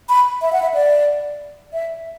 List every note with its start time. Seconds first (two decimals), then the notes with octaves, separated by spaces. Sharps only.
0.09 B5
0.42 E5
0.53 F#5
0.62 E5
0.74 D5
1.73 E5